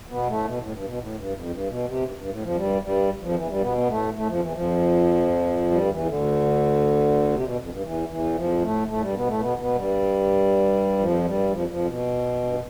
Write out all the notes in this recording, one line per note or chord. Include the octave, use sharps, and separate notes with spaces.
B2 B3
A2 A3
B2
A2
G2
B2
A2
G2
F2
G2
B2
C3
G2
G2
A2
F2 F3
G2 G3
G2 G3
F2 F3
E2 E3
G2 G3
B2 B3
B3
A2 A3
A2 A3
F2 F3
E2 E3
F2 F3
G2 G3
D3
E2 E3
D2 D3
C3
B2
F2
G2
E2 E3
E2 E3
F2 F3
A2 A3
A2 A3
G2 G3
B2 B3
A2 A3
B2 B3
B2 B3
G2 G3
F2 F3
G2 G3
F2 F3
F2 F3
B2
G2